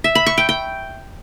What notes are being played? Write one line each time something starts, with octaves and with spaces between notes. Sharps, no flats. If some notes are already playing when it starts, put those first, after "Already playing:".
E5
B5
C#6
G5
G5